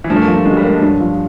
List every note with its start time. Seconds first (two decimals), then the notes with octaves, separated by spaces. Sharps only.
0.04 E3
0.10 G2 F3
0.16 A3
0.21 A#3
0.28 F3
0.34 A3
0.45 D3 G#3
0.53 F#3
0.57 G3
0.64 A#3
0.69 G#3
0.81 G2 F#3
1.00 F3